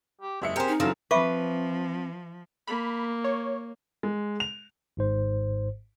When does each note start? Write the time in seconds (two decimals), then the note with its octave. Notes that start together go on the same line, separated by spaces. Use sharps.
0.21 G4
0.42 F#1 G#3 E5 C#7
0.56 C4 G4 G#4 A#4 C5
0.68 D#4
0.80 C#3 E3 F#3 A3 A#3 C4 F5
1.11 F3 C4 B4 E5 C#6 D6
2.67 A#3 B5
3.24 C#5
4.03 G#3
4.40 F7
4.97 G#1 G#2 C5